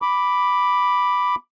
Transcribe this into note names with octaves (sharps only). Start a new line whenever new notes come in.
B5 D6